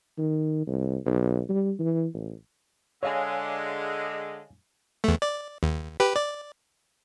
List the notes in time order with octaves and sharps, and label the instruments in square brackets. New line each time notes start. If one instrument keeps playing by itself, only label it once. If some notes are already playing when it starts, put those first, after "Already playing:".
[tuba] D#3
C2
B1
G3
E3
A1
[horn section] D3 G#3 [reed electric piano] C#5 F5 G#5
[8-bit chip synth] E2 A3
D5
D#2
G4 B4
D5